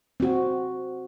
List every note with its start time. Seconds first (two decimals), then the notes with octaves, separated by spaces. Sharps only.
0.20 C4 F#4